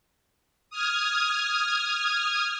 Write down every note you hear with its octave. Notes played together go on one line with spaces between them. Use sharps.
D#6 F6 G#6